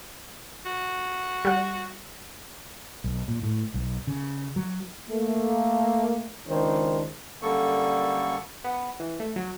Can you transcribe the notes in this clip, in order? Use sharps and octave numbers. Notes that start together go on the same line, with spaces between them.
F#4
G3 F#5
B1
A#2
A2
B1
C#3
F#3
A3 A#3
C#2 D#3 D4 C5
F#2 D3 G3 A#3 A4 C#6
B3
E3
A3
F#3